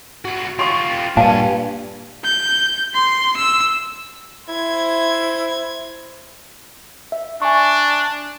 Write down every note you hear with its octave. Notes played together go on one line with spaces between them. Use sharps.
C2 F#4
F4 G4 C6 C#6
G2 A#2 D4 F5 G#5 A5
G6
C6
E6
E4 C5 G#6
E5
D4 G#5 C#6